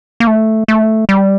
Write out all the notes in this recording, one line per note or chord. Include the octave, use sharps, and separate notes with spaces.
A#3
A3
A3
G3